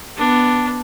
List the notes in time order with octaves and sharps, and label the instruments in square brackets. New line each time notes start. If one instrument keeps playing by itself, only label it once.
[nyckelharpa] B3 D4